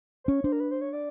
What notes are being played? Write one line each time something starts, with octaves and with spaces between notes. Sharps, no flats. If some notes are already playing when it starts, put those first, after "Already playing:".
C5
C#4 C#5
D4 C5
A#4
B4
C5
C#5
D5